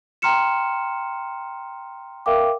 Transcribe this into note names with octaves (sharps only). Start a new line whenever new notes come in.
G5 A#5 C6 F6 C#7 E7
A#4 E5 F5 G5 D6